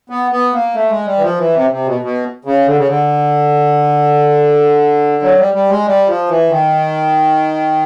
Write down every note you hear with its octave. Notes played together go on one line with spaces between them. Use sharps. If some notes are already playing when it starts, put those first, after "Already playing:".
B3
B3
A#3
A3
G#3
G3
E3
F3
E3
C3
C3
B2
B2
C#3
D3
C#3
D3
F#3
G3
G3
G#3
G3
F3
E3
D#3